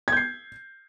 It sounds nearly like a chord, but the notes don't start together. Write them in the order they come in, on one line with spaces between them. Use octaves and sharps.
G#6 G6 C7